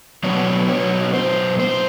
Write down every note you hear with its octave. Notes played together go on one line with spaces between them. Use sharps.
B2 F#3 B3 D4 C#5
C#5
C5
C5